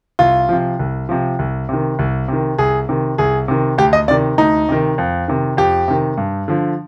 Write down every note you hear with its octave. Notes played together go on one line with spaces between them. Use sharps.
C2 F4
C3 F3
C2
C3 F3
C2
C3 D#3
C2
C3 D#3
C2 G#4
C3 D#3
C2 G#4
C3 D#3
D2 G4
D#5
C3 D#3 D5
D2 D#4
C3 D#3
F2
C3 D#3
F2 G4
C3 D#3
G2
D3 F3